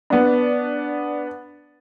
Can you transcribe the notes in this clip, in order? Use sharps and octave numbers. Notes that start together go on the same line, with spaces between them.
B3 D4